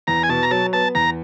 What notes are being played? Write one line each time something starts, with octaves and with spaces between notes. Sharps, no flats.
E2 A#5
G#5
B2 A5
A#5
F#3 A5
B3 A5
E2 A#5